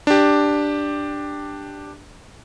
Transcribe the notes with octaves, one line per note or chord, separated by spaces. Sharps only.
D4 G4